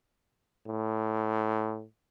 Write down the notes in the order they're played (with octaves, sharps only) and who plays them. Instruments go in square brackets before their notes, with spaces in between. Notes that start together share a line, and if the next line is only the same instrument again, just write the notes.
[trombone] A2